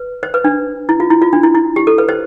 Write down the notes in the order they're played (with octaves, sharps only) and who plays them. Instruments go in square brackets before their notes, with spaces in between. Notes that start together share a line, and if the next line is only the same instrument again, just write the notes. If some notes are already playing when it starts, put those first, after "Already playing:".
Already playing: [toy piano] B4
C5
B4
D4
E4
F4
E4
F4
D4
E4
E4
G4
A4
B4
C5